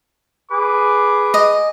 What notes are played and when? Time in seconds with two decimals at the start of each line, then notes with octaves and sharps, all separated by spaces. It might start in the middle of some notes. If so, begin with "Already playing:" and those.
0.51 G#4 B4 D6
1.34 D#5